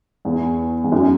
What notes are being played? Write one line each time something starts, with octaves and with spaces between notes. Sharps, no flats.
E2
E2
F#2